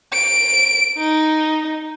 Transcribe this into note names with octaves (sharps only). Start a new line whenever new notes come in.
D7
D#4